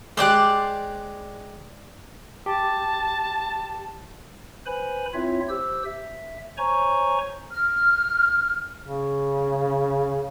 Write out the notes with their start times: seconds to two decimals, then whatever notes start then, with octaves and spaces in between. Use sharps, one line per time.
0.17 G#3 G4 C5 D5 F#6
2.46 G4 A5
4.66 B4 C5 G#5 B5
5.14 C4 E4 F4 C#5 E5
5.49 G4 C5 E6
5.85 E5
6.58 C5 C#5 G#5 A#5 C#6
7.51 F6
8.82 C#3